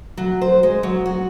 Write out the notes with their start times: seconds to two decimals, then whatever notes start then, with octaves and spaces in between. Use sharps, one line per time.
0.17 F#3
0.41 C5
0.63 G#3
0.83 F#3
1.06 F#4